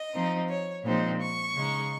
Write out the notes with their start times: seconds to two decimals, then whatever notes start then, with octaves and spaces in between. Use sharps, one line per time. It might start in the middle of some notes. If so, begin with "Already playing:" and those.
Already playing: D#5
0.14 F3 C4 D#4
0.49 C#5
0.85 A#2 F3 G#3 C4 D#4
1.21 C#6
1.56 C#3 G#3 D#4